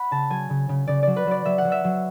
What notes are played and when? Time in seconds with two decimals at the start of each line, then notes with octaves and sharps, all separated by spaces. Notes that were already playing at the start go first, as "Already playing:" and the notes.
Already playing: F#5 B5
0.11 C#3 A5
0.30 F#3 G#5
0.50 C#3
0.69 C#3
0.87 C#3 D5
1.03 F#3 D5
1.16 B4
1.27 F#3 D5
1.45 F#3 E5
1.58 F#5
1.65 F#3
1.72 E5
1.84 F#3